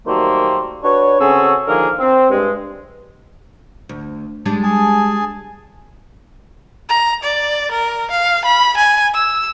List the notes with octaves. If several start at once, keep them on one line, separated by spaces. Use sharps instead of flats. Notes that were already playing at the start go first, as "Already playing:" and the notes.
D#3 F#3 G3 A3 A#3 C5
D4 F#4 B4 C#5
C#3 C4 C#4 F#4 G#4 A4
D3 D#3 F3 A#3 G#4 A#4
C4
G2 G#3
D2
G3 G#3 D4
G#4 G#5 A5
A#5
D5
A#4
F5
B5
G#5
E6